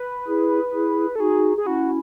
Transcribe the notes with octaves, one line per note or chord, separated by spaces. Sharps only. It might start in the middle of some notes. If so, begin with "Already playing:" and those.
Already playing: B4
E4 G#4
E4 G#4
A4
D#4 F#4 G#4
G#4
C#4 E4 F#4